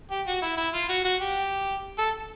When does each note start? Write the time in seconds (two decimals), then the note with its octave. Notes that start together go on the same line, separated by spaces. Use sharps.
0.11 G4
0.27 F#4
0.42 E4
0.57 E4
0.74 F4
0.89 F#4
1.04 F#4
1.21 G4
1.99 A4